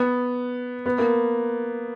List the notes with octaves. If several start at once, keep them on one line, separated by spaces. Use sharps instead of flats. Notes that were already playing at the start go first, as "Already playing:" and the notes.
Already playing: B3
B3
A#3